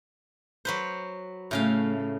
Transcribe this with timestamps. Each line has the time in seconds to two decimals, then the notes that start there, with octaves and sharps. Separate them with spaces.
0.65 F#3 B4 C5
1.51 A2 C#3 A3 F5